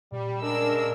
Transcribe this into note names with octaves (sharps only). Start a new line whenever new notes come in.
A#2 G3
C#3 G#3 D4 A#4 E6